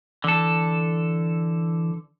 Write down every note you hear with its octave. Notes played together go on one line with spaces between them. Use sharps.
D3 E3 A4